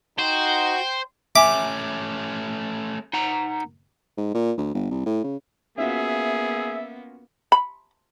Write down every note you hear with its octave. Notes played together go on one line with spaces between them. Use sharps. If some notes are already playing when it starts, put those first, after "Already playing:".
D#4 F#4 C5 G5
A3 C#4 E5 G#5 D6
D#4 F#5 A#5
G#2
A#2
D2
G1
C2
A2
C#3
A#3 B3 C#4 F4 F#4 G#4 E5
B5